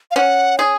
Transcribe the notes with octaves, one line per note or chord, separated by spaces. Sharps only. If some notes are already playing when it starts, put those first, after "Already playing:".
F5
C#4 F#5
G#4 G#5